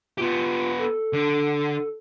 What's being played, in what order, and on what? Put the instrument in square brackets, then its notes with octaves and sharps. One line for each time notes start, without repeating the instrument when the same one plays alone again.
[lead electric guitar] B3 G4 [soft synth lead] F4
[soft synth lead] A4
[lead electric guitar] D3